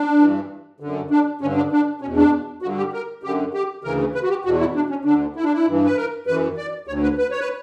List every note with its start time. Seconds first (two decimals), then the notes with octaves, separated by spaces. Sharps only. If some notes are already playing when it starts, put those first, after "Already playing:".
Already playing: D4
0.19 G2 E3
0.80 F#2 D3
1.11 D4
1.41 G2 C#4
1.44 D3
1.57 D4
1.72 D4
2.01 E2 B2 C#4
2.17 D4
2.62 G2 D3 F#4
2.77 G4
2.93 A#4
3.23 F#2 D3 G4
3.54 G4
3.84 D2 C#3 E3 A#4
4.15 B4
4.23 F#4
4.29 G4
4.45 E2 B2 F#4
4.60 E4
4.75 D4
4.90 C#4
5.05 D2 D3 D4
5.36 E4
5.44 D4
5.53 E4
5.66 G2 E3
5.85 B4
5.97 A#4
6.26 F#2 E3 B4
6.58 D5
6.87 D2 C#5
6.91 D3
7.03 B4
7.18 B4
7.31 C#5
7.40 B4